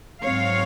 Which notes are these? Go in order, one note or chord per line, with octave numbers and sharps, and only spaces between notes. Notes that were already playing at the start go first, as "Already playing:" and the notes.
G#2 F#3 C4 C#5 F5